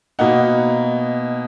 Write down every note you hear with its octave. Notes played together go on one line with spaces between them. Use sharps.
B2 A#3 D#4 F#5